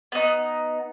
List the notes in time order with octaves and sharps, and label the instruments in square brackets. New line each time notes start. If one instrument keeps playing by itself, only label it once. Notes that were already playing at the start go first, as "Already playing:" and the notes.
[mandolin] B3 D#4